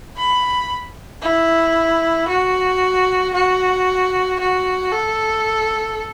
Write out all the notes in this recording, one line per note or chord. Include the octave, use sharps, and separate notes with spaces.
B5
E4
F#4
F#4
F#4
A4